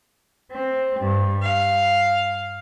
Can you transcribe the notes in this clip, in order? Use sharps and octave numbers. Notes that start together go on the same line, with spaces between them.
C4
G2
F5